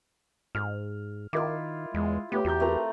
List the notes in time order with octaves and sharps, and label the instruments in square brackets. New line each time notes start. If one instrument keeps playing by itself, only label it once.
[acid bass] G#2 [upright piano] F6
[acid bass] D#3 [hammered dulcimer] E4 F4 [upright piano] A#4 D#5 D6
[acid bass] E2 [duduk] G#3
[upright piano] A3 B4 C#5 [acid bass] B3 [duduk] G4
[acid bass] E2 [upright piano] F#4 A#5 G6
[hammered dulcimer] A3 C4 A#5 [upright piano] F#4 A#4 B4